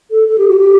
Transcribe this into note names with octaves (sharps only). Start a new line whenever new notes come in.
A4
A4
G4
F#4
G4